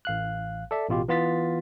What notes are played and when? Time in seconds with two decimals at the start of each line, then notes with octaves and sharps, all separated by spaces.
0.05 A1 F5 F#6
0.71 A4 D5 E5
0.89 A1 B2 F4 G4
1.08 E3 B3 F4 A6 B6